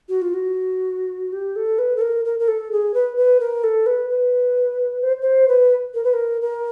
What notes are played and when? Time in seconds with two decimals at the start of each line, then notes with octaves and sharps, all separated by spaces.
0.09 F#4
0.21 F4
0.33 F#4
1.32 G4
1.55 A4
1.78 B4
1.96 A4
2.01 A#4
2.25 A#4
2.39 A#4
2.47 A4
2.71 G#4
2.94 B4
3.16 B4
3.40 A#4
3.63 A4
3.86 B4
4.09 B4
5.02 C5
5.21 C5
5.48 B4
5.94 A#4
6.04 B4
6.13 A#4
6.41 A#4